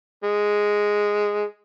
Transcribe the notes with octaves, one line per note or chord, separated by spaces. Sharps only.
G#3